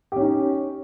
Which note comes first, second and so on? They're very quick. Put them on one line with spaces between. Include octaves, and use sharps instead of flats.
G4 C#4 D#4